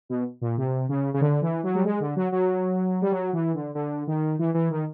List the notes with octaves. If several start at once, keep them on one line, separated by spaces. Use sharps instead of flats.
B2
A#2
C3
C#3
C#3
D3
E3
F#3
G3
G#3
D3
F#3
F#3
G3
F#3
E3
D3
D3
D#3
E3
E3
D#3